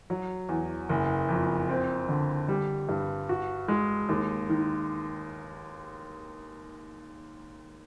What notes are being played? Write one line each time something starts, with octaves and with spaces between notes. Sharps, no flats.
F#3
E2
F#1
F2
C4
D3
G3
G2
F#4
G#3
D#2
D#3